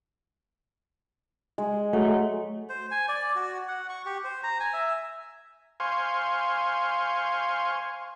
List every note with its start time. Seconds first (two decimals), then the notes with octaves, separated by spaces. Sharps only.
1.58 G#3
1.93 F#3 A3
2.69 C5
2.91 G#5
3.08 D5
3.36 F#4
3.68 F#5
3.89 C#6
4.06 G4
4.24 C5
4.44 A#5
4.60 G#5
4.73 E5
5.80 C5 F5 G#5 C6 C#6